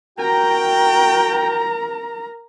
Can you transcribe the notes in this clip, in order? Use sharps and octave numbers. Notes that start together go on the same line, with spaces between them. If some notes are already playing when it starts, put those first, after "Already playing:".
F#4 A#4 G5 A#5